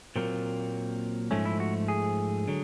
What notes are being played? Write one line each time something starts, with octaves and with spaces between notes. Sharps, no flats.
A#2 F#3 A#3 C4
G#2 F3 A3 C#4
E4
F#4
G#4
D3 F#3